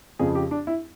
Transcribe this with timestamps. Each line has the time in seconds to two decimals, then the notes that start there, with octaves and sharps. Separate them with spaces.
0.19 F2 C#3 F3 G#4
0.35 G4
0.51 D4
0.67 E4